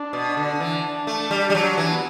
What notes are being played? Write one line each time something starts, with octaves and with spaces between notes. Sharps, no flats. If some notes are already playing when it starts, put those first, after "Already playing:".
Already playing: D4
B2
D3
E3 D4
A3
G3
G3
F#3
E3
B3